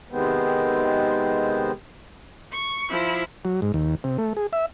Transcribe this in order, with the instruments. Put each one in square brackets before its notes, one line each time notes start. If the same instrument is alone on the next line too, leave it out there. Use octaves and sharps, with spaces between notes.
[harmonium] C3 D#3 G#3 B3 C4
[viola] C#6
F3 E4
[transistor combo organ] F#3
G#2
D#2
C3
A3
G#4
E5